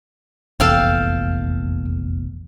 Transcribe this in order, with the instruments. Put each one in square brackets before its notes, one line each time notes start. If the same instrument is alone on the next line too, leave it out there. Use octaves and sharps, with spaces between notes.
[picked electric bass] F1 A#1 E2 [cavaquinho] A4 F5 G5